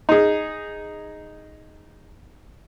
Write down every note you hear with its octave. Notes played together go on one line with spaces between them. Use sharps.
D#4 G#4